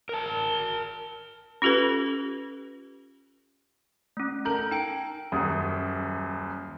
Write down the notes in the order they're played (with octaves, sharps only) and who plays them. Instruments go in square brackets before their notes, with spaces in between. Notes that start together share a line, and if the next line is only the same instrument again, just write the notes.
[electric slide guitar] A#4 A5
[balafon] C#4 F4 G4 A4 B4
[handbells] A3 C#4
[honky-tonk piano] A4 A#4 F#7 [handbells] G6
[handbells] D#4 G5 D7
[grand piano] D#1 F#2 D#6